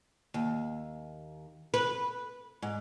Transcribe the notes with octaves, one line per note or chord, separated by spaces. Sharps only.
D#2
B4
G#2